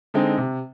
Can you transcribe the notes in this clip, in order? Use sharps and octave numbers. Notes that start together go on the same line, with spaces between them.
D3 G#3 C4 D#4
C3